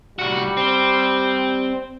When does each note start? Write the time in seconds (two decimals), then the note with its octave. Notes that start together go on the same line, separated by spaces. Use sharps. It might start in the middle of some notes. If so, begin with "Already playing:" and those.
0.19 C2 G3 F#4
0.57 C4